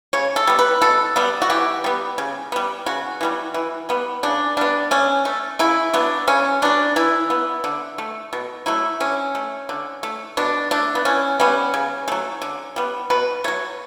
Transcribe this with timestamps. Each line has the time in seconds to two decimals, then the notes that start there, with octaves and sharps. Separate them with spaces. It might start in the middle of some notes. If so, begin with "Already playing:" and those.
0.13 C#3 C#5
0.36 A4
0.47 G3 B3
0.59 B4
0.82 B2 A4
1.16 G3 B3
1.42 F#4
1.50 E3 G4
1.84 G3 B3
2.18 C#3
2.52 G3 B3
2.86 C#3 F#4
3.21 E3 G3 B3
3.54 E3
3.89 G3 B3
4.23 C#3 D4
4.57 G3 B3 D4
4.91 D3 C#4
5.25 A3
5.59 C#3 E4
5.94 F#3 B3 D4
6.27 C#3 C#4
6.62 F#3 B3 D4
6.96 E3 E4
7.30 B3
7.64 D3
7.98 A3
8.33 B2
8.66 F#3 A3 E4
9.00 D3 C#4
9.35 A3
9.69 D3
10.03 A3
10.37 B2 D4
10.71 A3 D4
10.95 B3
11.05 E3 C#4
11.40 G3 B3 C#4
11.74 C#3
12.08 F#3 A3
12.42 D3
12.76 G3 B3
13.10 B2 B4
13.44 F#3 A3 C#5